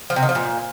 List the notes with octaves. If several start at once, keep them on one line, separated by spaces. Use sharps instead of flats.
F3
C3
D#3
F3
A#2